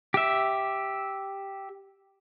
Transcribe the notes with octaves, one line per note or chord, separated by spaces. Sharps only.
G4 E5